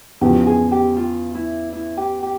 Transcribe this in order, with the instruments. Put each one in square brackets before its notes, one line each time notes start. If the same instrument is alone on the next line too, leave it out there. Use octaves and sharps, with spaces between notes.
[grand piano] E2 C#3 F3 [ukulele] G4
[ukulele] G#4
G4
F4
E4
E4
G4
G4